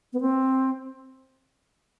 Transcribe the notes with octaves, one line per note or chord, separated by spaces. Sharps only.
B3
C4